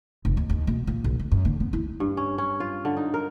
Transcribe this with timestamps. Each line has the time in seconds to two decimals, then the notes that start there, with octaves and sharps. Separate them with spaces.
0.25 F1
0.37 D#2
0.50 D#2
0.67 B2
0.87 A#2
1.04 B1
1.19 D2
1.32 F#2
1.45 D3
1.60 B3
1.73 E4
2.00 G2
2.17 C#4
2.38 C#4
2.60 F4
2.85 D3
2.97 D#4
3.14 A#4